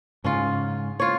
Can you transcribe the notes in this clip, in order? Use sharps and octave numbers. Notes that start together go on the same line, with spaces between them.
G#2 C#3 C#4 F4
F4 C#5